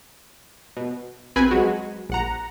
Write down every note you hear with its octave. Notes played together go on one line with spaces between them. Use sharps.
B2
A#1 C4 B4 G#5 B5
F#3 G#3 F#4
A#1 F#5 A#5